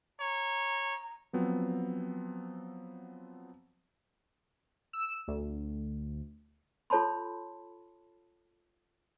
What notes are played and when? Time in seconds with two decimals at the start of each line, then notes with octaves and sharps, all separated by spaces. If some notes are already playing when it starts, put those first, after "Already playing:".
0.20 C#5 A#5
1.33 F3 F#3 B3 C4
4.93 E6
5.28 D2
6.90 F4 A4 C#5 A5 B5 C6